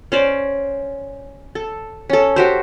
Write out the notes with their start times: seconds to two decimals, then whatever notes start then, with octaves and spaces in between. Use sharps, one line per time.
0.12 C#4 C5 D5
1.55 A4
2.10 C#4 A4
2.36 F#4 G4 C5